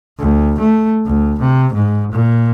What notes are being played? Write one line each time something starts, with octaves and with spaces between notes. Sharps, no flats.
D2
A3
D2
C3
G#2
A#2